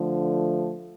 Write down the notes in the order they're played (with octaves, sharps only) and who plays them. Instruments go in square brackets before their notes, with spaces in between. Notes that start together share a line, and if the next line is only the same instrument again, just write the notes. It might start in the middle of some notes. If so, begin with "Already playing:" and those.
Already playing: [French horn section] D3 F3 A3